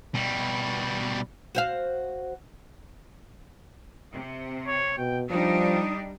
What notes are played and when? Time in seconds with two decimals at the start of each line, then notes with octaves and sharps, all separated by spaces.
0.15 B2 G3
1.55 F#4 C5 F5
4.12 C3
4.67 C#5
4.98 B2 G5
5.30 F3 G3 D4 D#4 D#6